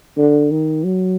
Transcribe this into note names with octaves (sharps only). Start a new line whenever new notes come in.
D3
D#3
F#3